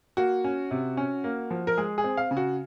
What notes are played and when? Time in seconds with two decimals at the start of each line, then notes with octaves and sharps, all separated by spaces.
0.17 A#3 F#4
0.44 C#4
0.71 C3
0.97 C#4
1.24 A#3
1.51 F3
1.67 A#4
1.77 G#3 G#4
1.98 G#4
2.04 C4
2.17 F5
2.31 C#3
2.37 F#4